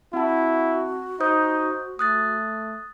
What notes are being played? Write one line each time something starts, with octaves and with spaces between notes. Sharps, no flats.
C4 E4 F#4 F#5 A5
D#4 C5 D#6 G6
A3 D#6 F#6 A6